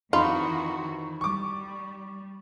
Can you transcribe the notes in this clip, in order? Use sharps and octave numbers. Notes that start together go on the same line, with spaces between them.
F2 D#3 E3 D#4 F4 F#4 B5 C6
G3 C#6 D6